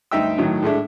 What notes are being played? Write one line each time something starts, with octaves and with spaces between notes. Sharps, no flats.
D2 G2 D#4 E5 G5 E6
A2 D#3 F#3
A2 G#3 A3 D4